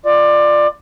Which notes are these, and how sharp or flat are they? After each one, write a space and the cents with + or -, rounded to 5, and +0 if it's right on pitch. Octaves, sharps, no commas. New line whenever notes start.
F4 +0 D5 +20